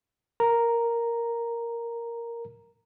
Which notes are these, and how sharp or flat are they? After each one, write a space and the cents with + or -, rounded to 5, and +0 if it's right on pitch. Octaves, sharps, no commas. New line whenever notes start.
A#4 +0 A#5 +0